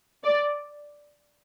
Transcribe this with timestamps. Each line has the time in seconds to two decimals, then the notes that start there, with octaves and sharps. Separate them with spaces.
0.24 D5